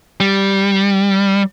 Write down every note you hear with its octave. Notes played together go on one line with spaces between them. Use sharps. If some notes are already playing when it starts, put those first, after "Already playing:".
G3